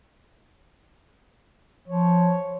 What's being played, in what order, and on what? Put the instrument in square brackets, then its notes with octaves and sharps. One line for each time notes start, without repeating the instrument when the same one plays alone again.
[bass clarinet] F3 [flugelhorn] C#5